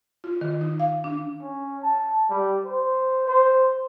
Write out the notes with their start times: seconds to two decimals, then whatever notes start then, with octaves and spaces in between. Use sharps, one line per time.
0.24 F4
0.41 D#3
0.61 D#4
0.80 F5
1.04 D4
1.42 C#4
1.83 A5
2.30 G3
2.66 C5
3.28 C5